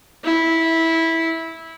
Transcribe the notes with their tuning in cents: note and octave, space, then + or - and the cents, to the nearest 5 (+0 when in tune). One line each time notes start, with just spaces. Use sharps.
E4 -15